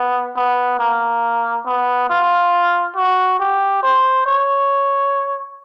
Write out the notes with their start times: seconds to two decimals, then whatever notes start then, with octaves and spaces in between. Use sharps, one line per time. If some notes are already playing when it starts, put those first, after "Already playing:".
Already playing: B3
0.37 B3
0.79 A#3
1.67 B3
2.10 F4
2.96 F#4
3.40 G4
3.83 C5
4.26 C#5